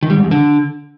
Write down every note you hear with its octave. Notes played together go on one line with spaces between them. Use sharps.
D#3
G3
G#2
E2
D3